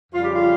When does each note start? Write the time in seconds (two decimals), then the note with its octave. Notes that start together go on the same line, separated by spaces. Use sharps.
0.13 F2 C#3 G3 F4
0.23 G4
0.36 F4